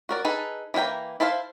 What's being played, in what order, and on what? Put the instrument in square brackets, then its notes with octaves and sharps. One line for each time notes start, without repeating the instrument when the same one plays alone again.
[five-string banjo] F#4 A#4 D5
D#4 G#4 A4 B4
E3 A#3 E4 G5 A#5
E4 A4 C5 E5 F5